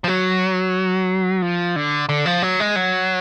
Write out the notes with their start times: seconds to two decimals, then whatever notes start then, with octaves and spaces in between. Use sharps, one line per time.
0.04 F3
0.08 F#3
1.42 F3
1.76 D3
2.09 D3
2.26 F3
2.43 F#3
2.60 G#3
2.76 F#3